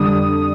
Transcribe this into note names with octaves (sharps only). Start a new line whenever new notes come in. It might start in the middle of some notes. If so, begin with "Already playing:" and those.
Already playing: F2 D3 G3 D4 D#6